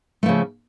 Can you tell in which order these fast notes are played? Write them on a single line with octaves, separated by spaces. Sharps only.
A3 F3 C#3